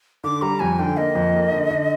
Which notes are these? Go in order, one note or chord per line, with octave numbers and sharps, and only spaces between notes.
D3 D6
G3 A#5
F2 G#5
D3 G5
A#3 D#5
F2
A#3
D3
D3